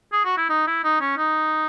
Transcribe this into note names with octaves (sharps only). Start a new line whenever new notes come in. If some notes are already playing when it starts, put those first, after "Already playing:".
G#4
F#4
E4
D#4
E4
D#4
C#4
D#4